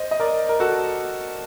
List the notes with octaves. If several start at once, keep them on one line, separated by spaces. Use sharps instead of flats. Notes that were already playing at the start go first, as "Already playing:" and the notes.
Already playing: C5 D#5
D#5
A#4 D5
A#4
F#4 A4